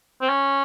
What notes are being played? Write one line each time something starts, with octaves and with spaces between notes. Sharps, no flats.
C4
C#4